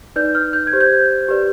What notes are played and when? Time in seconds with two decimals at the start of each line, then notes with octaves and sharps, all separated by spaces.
0.16 D#4 B4 D5 G6
0.35 F6
0.53 G6
0.67 G#6
0.73 G4 C5
0.80 G6
1.28 G4 B4 D5